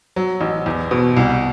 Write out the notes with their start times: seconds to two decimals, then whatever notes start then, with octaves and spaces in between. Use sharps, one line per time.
0.16 F#3
0.41 A1
0.66 E2
0.91 B2
1.17 C2